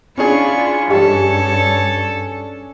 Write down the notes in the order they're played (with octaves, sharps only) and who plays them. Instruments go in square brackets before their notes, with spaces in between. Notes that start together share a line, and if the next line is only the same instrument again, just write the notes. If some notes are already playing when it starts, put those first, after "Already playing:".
[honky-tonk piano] C#4 D4 G#4 [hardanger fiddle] E4 C#6 [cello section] F4
[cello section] G2 [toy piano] G4 D#5 G5 [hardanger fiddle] A4 C#5